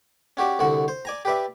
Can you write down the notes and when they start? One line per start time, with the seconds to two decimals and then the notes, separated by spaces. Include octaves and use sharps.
0.37 C#4 F#4 G4 D5
0.59 C2 D3 F#4 F#5
0.88 C5
1.05 D5 G#5 A#5
1.25 G4 B4 D5 E5